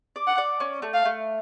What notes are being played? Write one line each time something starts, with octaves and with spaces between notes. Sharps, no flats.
D5
F#5
D5
C#4
A3
F5
A3